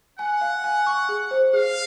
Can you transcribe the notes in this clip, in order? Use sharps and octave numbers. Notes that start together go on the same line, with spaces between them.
F#5 G#5
F5
G#5
C#6
G#4
C5
G#4 F5